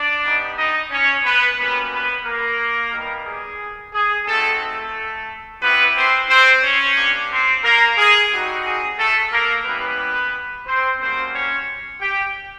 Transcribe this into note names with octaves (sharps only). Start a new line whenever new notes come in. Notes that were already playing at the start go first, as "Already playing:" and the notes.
Already playing: D4 D5
B3 D#4 G4
D#4 D#5
C#4 C#5
B3 B4
G3 A#3 B3 C#4 F#4 B4
B3 B4
A#3 A#4
G3 B3 D#4 G4
G#4
G#4
A3 C4 D#4 F#4 A4
A3 A4
B3 C4 E4 G4 B4
C4 C5
C4 C5
C#4 C#5
A#3 D4 G4
C4 C5
A#3 A#4
G#4
G3 C4 D#4 F#4
G#4
A3 A4
A#3 A#4
G3 A#3 B3 C#4 E4 G4 B4
C4 C5
G3 A#3 C4 C#4 F#4 C5
C#4 C#5
G4 G5